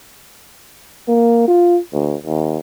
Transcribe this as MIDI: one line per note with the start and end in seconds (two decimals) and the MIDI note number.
1.08 1.48 58
1.48 1.79 65
1.93 2.15 38
2.26 2.58 39